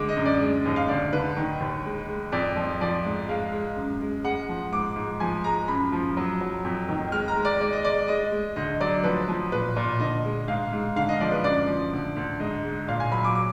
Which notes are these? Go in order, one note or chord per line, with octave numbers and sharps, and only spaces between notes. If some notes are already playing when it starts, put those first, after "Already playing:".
Already playing: D2 G#3 D6
D#5
F#2
D5
G#3
D#2 D#5
F5
D2 D5
D3 B4
D#3
D#2
G#3
G#3
F2 D5
F3
F3 D5
G#2
G#3 F5
G#3
F#2
G#3
G#3 F#5
F3
G#2 D6
G#2
F3 G#5
G#3 A#5
F#2 B5
F3
F#3
F#3
F2
D#3
G#3 F6
A#5
G#3
D5
G#3 D5
D#5
G#3 D5
G#3 D#5
G#3
D2 D#5
F#3 D5
F3 B4
F3
A#2 B4
A#2
D3 D#5
G#3
G#2 F5
G#2
D3 F5
D#5
F3 D5
B4
F#2 D5
F3
D2
D2
G#2 D#5
G#3
A#2 F5
G#5
F#3 B5
D6
D6